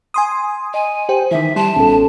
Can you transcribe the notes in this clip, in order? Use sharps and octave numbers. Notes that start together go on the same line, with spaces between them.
G#5 C6 D#6
D#5 G#5
G4 C5 G5
D#3 E3 E5
G3 A5 C6
A1 B2 C#4 A4